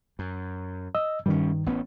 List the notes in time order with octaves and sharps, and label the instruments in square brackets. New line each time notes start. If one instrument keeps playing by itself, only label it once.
[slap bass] F#2
[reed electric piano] D#5 E6
[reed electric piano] G2 D#3 [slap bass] G3 C#4
[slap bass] A1 B3 C#4